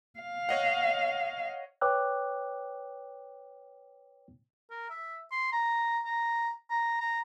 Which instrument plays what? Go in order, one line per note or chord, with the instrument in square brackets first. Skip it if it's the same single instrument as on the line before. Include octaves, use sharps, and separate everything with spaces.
[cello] F5
[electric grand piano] C#5 D#5 F#5
[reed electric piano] B4 C#5 G5 D6 E6 F#6
[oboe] A#4
E5
C6
A#5
A#5
A#5
A#5